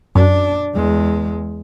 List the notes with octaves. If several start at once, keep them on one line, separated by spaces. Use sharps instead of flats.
F#2 D4
E2 G#3